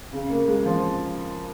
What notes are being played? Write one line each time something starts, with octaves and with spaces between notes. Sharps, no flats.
C#3
A#3
G#3
F3